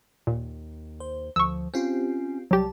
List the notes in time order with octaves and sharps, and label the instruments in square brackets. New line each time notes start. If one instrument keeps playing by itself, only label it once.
[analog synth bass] D#2 [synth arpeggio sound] A#2
[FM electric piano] C5
[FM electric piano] D2 [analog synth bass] F3 [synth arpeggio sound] C#6 E6
[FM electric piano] C4 F4 G4 [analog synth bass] C#4
[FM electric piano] C2 A5 [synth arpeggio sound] F#3 G4 [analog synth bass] G3